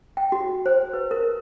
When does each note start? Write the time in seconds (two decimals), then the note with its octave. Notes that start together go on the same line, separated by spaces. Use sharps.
0.17 G5
0.32 F#4
0.66 C5
0.93 B4
1.11 A#4